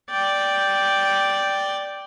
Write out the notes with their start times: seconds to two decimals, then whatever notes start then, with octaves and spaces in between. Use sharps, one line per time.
0.11 D5 G5